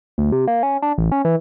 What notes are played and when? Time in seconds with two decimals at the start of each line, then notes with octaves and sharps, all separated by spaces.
0.18 D2
0.32 C3
0.48 A#3
0.63 C#4
0.82 D4
0.98 A1
1.12 C#4
1.25 E3